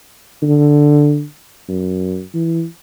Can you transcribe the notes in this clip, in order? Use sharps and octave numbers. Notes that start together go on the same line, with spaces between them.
D3
F#2
E3